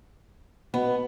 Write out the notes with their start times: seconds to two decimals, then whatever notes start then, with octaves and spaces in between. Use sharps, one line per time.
0.74 B2 B3